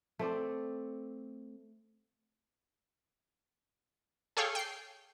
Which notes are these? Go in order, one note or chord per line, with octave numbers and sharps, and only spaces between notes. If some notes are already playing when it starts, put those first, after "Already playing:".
A3 C4 D5
G#4 A4 C#5 F5 G5
G5 C7